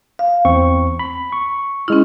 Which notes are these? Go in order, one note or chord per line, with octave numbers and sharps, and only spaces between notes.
F5
E2 C4 C#6
B5
C#6
G#3 C#4 E4 F6